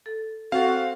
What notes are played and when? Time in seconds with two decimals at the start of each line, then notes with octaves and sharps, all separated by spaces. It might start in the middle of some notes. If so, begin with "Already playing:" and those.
0.06 A4
0.52 C4 F#4 A4 C5 F5